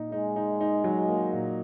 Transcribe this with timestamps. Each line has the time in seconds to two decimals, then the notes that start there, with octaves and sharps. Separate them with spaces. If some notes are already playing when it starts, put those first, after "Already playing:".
Already playing: A#2 D#4
0.12 G#3 D#4
0.36 D#4
0.61 D#4
0.84 F#3
1.08 A#3
1.33 A#2